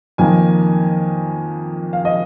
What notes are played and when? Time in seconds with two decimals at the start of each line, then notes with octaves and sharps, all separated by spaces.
0.18 F2 D#3 A#3 G#5
1.93 F5
2.05 D#5